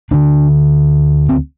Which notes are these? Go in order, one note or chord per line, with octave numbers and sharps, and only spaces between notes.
D2 D3 D4
C4